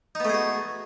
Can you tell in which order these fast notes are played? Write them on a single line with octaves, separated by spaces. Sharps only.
D#4 B3 A3 G#4 F#4